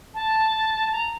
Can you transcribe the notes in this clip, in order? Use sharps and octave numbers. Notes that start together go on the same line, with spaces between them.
A5
A#5